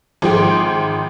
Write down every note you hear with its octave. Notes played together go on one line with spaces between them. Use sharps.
G#1 F3 G#4 G5 C6